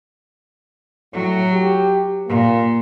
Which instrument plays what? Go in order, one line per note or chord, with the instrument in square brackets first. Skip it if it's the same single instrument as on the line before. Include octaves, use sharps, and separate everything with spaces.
[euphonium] A2 [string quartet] F#3
[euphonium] G4
[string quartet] A#2 [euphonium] A#3